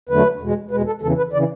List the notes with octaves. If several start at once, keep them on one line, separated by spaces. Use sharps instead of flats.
E2 D3 F#3 A3 B4
E2 B2 G#3
E2 B2 G#3 B4
A4
E2 C#3 E3 A4
B4
C#3 E3 D5